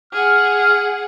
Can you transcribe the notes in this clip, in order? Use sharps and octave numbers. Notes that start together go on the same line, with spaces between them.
G#4 F#5 F6